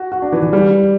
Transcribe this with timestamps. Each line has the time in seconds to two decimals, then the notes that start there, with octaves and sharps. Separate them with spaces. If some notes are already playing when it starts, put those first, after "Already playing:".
Already playing: F#4
0.12 F#4
0.22 D4
0.32 E3
0.42 E3
0.53 G3